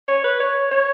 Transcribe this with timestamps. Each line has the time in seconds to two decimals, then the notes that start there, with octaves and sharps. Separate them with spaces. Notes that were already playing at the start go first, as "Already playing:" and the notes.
0.08 C#5
0.24 B4
0.40 C#5
0.71 C#5